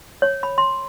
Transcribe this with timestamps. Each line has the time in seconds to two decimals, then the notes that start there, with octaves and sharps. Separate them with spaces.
0.22 C#5
0.43 B5
0.58 C6